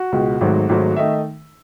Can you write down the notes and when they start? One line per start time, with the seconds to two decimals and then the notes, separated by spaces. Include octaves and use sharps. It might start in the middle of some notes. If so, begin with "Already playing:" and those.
Already playing: F#4
0.12 C#2 B2 G#3
0.41 G#1 G#2 F#3 A3
0.69 G#1 G#2 F#3 A3
0.96 D#3 A3 D#4 E5